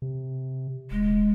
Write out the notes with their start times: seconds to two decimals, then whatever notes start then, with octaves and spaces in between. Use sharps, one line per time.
0.02 C3
0.91 D#1 G#3